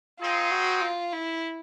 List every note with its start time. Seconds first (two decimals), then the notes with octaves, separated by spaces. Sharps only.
0.20 C4 D#4 F4 G#4
0.51 F#4
0.81 F4
1.13 E4